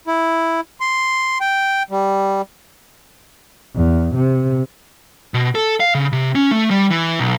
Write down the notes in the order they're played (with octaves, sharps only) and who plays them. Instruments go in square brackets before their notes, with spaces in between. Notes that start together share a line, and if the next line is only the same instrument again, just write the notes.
[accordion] E4
C6
G5
G3
[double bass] E2
C3
[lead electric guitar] B2
A4
F5
C#3
C3
C#4
A3
G3
E3
B1